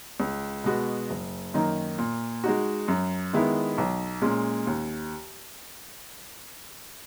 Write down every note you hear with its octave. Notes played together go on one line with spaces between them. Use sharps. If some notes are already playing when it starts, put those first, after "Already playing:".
C#2
B2 G#3 B3 F#4
F#1
F#2 D#3 A#3 D#4
A#2
G#3 D#4 F#4
F#2
D#3 G#3 B3 E4
B1
A#2 G#3 C#4
D#2